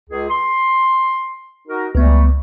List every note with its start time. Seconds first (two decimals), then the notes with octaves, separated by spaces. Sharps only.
0.10 C#2 G#4
0.29 C6
1.68 D#4 F#4 A#4
1.95 C#2 A#2 G3 A3 B3